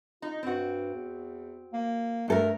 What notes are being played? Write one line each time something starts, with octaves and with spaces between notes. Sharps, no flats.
D#4 F4
G2 C4 F#4
E2
A#3
G2 A3 A4 A#4